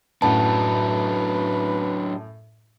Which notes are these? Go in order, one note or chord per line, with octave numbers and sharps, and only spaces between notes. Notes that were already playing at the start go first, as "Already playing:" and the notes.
F#2 A2 F#3 D4 B4 F#5 A5